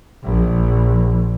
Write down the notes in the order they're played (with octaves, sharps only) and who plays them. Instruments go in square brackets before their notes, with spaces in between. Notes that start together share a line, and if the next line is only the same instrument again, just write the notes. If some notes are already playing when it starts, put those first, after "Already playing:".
[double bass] A#1